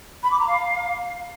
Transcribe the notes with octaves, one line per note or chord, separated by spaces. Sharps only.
B5
D6
A#5
F5